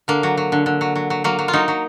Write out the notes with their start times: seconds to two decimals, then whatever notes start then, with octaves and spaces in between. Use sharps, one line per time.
0.08 D3 A#3
0.23 F#3
0.37 F#3
0.52 D3
0.66 D3
0.81 F#3
0.96 F#3
1.10 F#3
1.24 F#3 A#3
1.39 F#3
1.48 F4
1.53 F#3 D#4
1.68 F#3